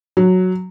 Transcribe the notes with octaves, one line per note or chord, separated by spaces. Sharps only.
F#3